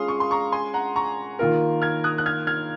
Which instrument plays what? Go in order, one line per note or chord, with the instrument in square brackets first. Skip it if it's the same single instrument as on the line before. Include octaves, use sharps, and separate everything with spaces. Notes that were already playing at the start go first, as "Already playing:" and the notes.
Already playing: [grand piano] G#3 C#4 F4 G#4 [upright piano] F5 C6 D#6
[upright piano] C#6
C6
A#5 C#6
G#5 C6
F#5 A#5
A#5 C#6
[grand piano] D#3 A#3 F4 A#4
[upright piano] F6 G#6
D#6 F#6
F#6
F6 G#6
F6 G#6